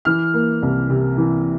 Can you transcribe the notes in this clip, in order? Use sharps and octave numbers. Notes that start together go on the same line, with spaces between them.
E3 F6
A#3
C2
C3
E3